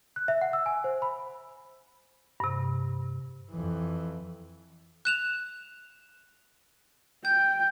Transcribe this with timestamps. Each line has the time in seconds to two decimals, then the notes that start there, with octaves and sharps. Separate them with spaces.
0.16 F#6
0.28 E5
0.41 F#5
0.53 E6
0.66 G#5
0.84 C5
1.02 B5
2.40 G2 C3
3.51 F2 E3
5.05 F#6 E7 F7
7.25 G5 G6